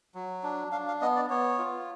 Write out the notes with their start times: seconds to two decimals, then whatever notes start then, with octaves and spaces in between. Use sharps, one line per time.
0.15 F#3
0.43 D4
0.72 D4 F5
0.87 F5
1.01 B3 D#5
1.16 D5
1.30 B3 C#5
1.58 F4